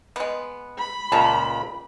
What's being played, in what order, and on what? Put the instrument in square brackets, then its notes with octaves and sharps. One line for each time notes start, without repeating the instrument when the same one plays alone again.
[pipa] G#3 B3
[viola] B5
[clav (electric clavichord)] C#2 A#2 [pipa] A5 A#5